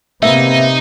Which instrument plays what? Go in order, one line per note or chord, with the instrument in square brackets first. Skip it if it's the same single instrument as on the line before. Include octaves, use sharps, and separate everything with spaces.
[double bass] C3 [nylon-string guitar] A#3 B3 [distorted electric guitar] D#4 [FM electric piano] E5